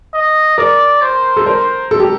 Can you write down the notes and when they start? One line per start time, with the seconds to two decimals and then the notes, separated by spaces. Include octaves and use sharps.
0.14 D#5
0.58 A#4 D5
1.02 C5
1.37 A4
1.46 A#4 C5
1.91 A4
2.00 G4